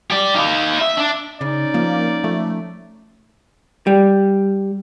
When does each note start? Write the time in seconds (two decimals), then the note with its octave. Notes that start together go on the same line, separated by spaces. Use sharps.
0.10 G4 D5
0.35 D#4 F5
0.79 E5
0.97 D4
1.41 C#3 C#4 D#4 D5
1.74 F3 A#3
2.24 F3 A3
3.87 G3